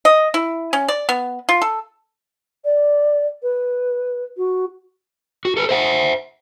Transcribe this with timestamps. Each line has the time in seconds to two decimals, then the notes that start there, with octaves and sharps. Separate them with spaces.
0.05 D#5
0.34 E4
0.73 C#4
0.88 D5
1.09 B3
1.49 F4
1.62 A4
2.64 D5
3.42 B4
4.37 F#4
5.45 F#4
5.57 A4 B4
5.69 C5 E5 F#5